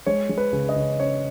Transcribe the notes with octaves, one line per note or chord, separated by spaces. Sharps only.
G#3 C#5
G#3
B4
C#3
D#5
C#3
C#4 C#5